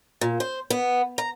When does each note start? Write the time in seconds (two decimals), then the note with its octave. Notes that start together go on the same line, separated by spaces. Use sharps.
0.21 A#2
0.40 C5
0.70 B3
1.18 A#5